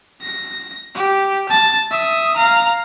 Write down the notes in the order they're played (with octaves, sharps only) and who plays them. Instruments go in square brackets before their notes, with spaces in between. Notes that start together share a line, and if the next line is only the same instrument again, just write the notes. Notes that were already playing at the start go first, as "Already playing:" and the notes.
[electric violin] A#6
G4
A5 A6
E5 D#6
F5 A#5